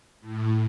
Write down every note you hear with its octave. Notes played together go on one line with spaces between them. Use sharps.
A2